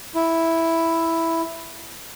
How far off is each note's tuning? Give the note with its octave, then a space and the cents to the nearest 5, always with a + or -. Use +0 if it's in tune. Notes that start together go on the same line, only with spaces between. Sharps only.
E4 +0